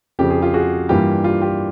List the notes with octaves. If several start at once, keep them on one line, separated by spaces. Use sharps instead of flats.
F2 C#3 F3 G4
G#4
F4 G4
F#4 G#4
G2 E3 G3 A#3 F4 G4
F4 G4
F4 G4